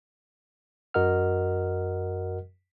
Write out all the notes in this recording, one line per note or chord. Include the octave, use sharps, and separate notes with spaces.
F#2 F#4 A#4 D#5 F#5 F6